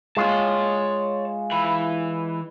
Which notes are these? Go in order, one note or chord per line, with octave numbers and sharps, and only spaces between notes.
G#3 F4 C#5 A5
E3 B5